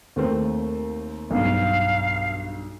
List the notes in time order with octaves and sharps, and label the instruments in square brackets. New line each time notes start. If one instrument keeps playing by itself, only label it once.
[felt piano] D#2 A3 C4
[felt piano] B1 G2 [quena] F5